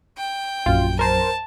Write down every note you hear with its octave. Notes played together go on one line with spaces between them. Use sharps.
G5
A#1 F#2 F4
A#4 C5 A5